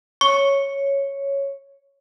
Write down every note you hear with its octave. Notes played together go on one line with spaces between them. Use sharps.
C#5 C#6